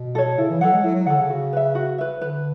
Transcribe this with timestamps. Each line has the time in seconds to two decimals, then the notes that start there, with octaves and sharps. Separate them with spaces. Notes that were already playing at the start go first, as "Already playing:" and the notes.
Already playing: B2
0.15 A4 C#5
0.37 C#3 E4
0.49 E3
0.60 F#3 A4 C#5 F#5
0.73 G#3
0.83 F#3 E4
0.95 F#3
1.06 D3 A4 C#5 F#5
1.18 C#3
1.29 F#4
1.53 B4 E5
1.75 F#4
1.98 B4 E5
2.21 D3 B4